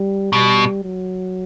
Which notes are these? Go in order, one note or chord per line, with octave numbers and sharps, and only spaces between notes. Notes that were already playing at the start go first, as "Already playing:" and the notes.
Already playing: G3
B2 G3
F#3